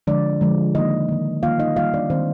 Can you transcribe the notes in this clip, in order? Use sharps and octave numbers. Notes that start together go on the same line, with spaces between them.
D3 F3 G#3 D4 D5
D3 F3 G#3
D#3 A#3 D#4 D#5
D#3 A#3
D#3 G3 A#3 F4 F5
D#4 D#5
D#3 G3 A#3 F4 F5
D4 D5
D#3 G#3 C4 C5